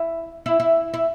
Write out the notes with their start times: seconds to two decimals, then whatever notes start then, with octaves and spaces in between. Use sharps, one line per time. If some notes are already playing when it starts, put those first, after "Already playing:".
Already playing: E4
0.46 E4
0.60 E4
0.94 E4